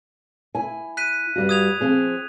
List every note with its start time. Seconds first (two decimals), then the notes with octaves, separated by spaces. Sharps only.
0.55 E4 G#5
0.97 F#6 B6 D#7
1.36 G2 G3 F#4
1.49 D#6 G#6 F7
1.81 F3 C4 G#4